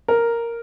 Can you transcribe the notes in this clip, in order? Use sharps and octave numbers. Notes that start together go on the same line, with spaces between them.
A#4